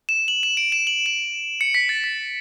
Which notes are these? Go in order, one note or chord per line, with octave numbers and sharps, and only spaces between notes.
E7
F#7
E7
D7
E7
F#7
E7
C#7
B6
A6
B6